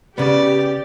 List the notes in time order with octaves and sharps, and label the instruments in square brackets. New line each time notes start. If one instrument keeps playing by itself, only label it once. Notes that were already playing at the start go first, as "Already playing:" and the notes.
[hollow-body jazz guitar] C#3 B3 [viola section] G4 [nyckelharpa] D5